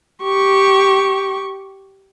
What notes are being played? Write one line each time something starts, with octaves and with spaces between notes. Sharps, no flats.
G4 C#6